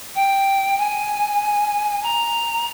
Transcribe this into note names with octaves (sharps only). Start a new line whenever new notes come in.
G5
G#5
A#5